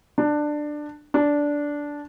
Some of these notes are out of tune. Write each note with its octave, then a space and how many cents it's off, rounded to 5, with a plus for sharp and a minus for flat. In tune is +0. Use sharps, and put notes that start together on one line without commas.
D4 +15
D4 -10